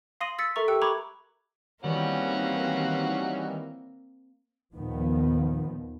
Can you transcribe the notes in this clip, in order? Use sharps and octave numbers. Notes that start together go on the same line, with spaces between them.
F5 C6 D#6 A#6 D#7 F#7
E6 A6 B6 C#7
A4 A#4 E5 A#5 C#6 A6
G4 G5 E6 F#6 C#7 D7
A#5 B5 C#6 D6 F#6 G#6
D#3 E3 G3 A#3 C4 C#4 F#4 F#5
D#2 A#2 D#3 F3 B3